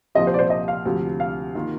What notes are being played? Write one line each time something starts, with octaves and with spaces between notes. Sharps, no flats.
C2 A#2 F3 C4 G4 D#5
C5
D5
C5
D#5
F5
D2 C3 F3
F5
D#3 A#3 F4